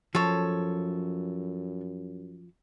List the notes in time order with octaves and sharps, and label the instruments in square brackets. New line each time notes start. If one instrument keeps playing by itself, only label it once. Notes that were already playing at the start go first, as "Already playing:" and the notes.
[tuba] F#2 [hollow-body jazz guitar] F3 [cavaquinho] A4 C#5